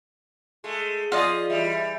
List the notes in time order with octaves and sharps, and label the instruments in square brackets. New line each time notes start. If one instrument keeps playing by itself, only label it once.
[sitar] G#3 A3
[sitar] F3 G#4 [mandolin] F4 D5 D#5
[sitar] E3 G3 [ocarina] E5